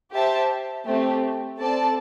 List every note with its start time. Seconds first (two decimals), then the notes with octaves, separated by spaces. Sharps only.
0.12 G4 C5 E5 A5
0.85 A3 C4 G4
1.58 C4 A4 D5 A5